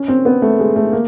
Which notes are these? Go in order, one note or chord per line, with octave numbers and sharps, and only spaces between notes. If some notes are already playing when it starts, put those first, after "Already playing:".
Already playing: C#4
C4
B3
A3
G#3
A3
A#3